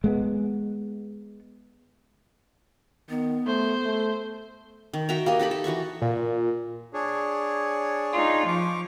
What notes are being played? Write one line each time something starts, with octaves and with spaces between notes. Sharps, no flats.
G#3 A#3 B3
D#3 B3
A3 C5
A3
D#3
F#4 E5 G5 A#5
A#3 G4 D#5
D#4 G4 A4 B5
A4
E3 F#4 A4 C#6
A#2
D4 G#4 C#5
D#4 F4
F3 C#6 D6